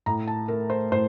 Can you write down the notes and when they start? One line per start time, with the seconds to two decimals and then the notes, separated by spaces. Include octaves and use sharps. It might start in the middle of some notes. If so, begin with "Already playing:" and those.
0.06 A2 A#5
0.27 A5
0.48 A3 A#4
0.70 C5
0.92 A2 C5